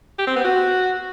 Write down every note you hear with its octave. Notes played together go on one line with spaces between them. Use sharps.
G4
C4
B3
F#4